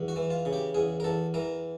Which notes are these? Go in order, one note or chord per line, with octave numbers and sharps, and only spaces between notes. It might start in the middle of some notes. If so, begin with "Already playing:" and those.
Already playing: E2
F#4
E3
F4
C#3
G4
E2 G#4
A#4
E2 A4
E3 A#4